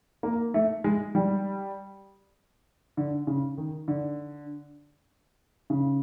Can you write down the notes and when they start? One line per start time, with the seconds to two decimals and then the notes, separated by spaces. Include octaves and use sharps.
0.23 A#3
0.54 A3
0.84 G#3
1.15 G3
2.97 D3
3.27 C#3
3.57 D#3
3.88 D3
5.70 C#3